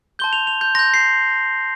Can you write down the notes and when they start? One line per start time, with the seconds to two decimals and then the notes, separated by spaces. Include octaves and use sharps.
0.19 A5 C6 G6 G7
0.33 F7
0.47 F7
0.61 G6
0.75 C6 G6 A#6
0.94 C7